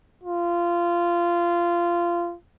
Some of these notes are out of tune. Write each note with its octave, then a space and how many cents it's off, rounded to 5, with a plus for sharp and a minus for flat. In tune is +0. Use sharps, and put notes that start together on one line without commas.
F4 -15